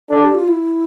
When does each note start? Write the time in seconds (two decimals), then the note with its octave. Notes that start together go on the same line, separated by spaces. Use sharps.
0.10 D4 A4
0.22 G4
0.35 F4
0.48 E4